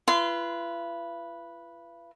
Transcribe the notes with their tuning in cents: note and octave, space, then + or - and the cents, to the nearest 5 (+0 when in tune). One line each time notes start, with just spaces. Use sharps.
F4 -45 B4 -5 C6 -25